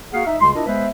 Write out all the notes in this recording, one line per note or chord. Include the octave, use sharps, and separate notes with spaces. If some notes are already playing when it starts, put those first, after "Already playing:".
A#3 F#4 G#4 F5 F#5
D#4 E5
C#2 C#3 G3 C6
D4 E4 F4 A#4 D#5
G#3 B3 B4 C5 E5